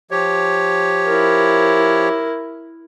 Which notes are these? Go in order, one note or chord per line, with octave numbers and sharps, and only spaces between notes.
F3 G4 C#5
E4 A#4